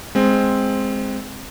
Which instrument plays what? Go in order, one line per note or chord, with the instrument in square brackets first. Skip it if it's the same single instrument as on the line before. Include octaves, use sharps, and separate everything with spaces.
[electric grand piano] G#3 C4